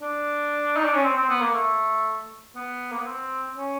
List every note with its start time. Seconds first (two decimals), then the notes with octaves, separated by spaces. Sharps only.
0.02 D4
0.76 D#4
0.85 D4
0.94 C#4
1.04 C4
1.17 C4
1.29 B3
1.41 A#3
1.54 A3
2.56 B3
2.91 A#3
2.99 B3
3.07 C4
3.57 C#4